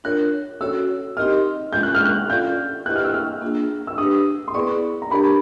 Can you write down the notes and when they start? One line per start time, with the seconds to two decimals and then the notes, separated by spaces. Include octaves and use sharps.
0.04 D4 F4 A#4 C#5 F#6
0.61 C#4 F#4 A4 C#5 E6
1.17 C4 D#4 G4 A#4 D#5 F6
1.73 G#3 C#4 F4 G6
1.83 F#6
1.95 F6
2.06 F#6
2.29 C#4 F4 A4 D5 F5 G6
2.86 E4 G4 B4 D#5 F#5 F#6
2.96 F6
3.05 E6
3.14 F6
3.41 A#3 D4 F4 G#4
3.87 E6
3.98 D4 G4 B4 D#6
4.48 C6
4.54 B3 E4 G#4 B4 D5 C#6
5.02 A#5
5.11 D4 G4 A#4 C#5 B5